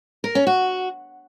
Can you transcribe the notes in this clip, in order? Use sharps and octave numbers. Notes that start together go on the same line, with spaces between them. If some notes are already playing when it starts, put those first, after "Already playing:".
A#4
C#4
F#4